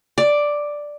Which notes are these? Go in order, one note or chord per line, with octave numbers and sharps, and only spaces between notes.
D5